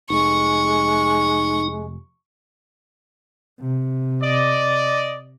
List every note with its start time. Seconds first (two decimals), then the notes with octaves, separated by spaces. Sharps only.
0.10 F1 G#3 D#4 C#6
3.61 C3
4.22 D5 D#5